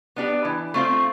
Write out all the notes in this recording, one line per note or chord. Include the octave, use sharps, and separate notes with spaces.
B3 D4 G4
E3
A3 C4 F4